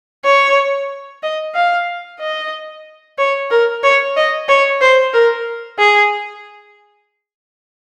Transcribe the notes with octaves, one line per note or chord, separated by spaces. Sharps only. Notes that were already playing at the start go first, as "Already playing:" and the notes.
C#5
D#5
F5
D#5
C#5
A#4
C#5
D#5
C#5
C5
A#4
G#4